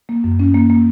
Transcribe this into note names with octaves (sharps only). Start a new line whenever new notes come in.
A#3
F#2
C#4
A#3
A#3